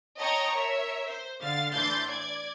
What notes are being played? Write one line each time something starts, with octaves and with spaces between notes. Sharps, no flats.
C#5 D#5 G5 A5 A#5 C#6
A#4 C#5 E5
C5
D3 F5 A6
A2 E3 D4 C6 G6 A6
D5 G#6